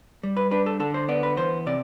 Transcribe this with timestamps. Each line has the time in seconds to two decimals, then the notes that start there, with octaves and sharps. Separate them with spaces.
0.23 G3
0.37 B4
0.51 D4 B4
0.66 A4
0.80 D3 A4
0.94 C5
1.08 B3 D5
1.23 B4
1.37 E3 C5
1.66 C3 D5